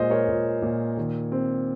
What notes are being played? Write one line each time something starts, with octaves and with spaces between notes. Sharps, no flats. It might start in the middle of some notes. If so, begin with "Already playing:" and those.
Already playing: A#2 G#3 C5 D#5
A#4 C#5
A#2
A#2
D#3
C4